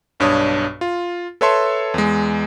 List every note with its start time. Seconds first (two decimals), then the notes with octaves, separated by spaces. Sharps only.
0.20 B1 G2 D4 C#5 D#6
0.81 F4
1.41 A4 B4 C#5 E5 A5 C6
1.94 E2 G#3